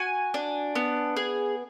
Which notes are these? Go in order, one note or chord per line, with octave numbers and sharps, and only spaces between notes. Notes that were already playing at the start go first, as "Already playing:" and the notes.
Already playing: F#4 G#5
D4
B3
G#4